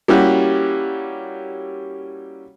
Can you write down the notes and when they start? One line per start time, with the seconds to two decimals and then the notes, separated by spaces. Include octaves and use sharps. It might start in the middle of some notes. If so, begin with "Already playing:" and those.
0.08 G3 A#3 C#4 E4 F#4 G4